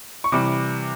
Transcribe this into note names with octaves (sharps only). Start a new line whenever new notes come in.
C#6
C3 E3 G3 D6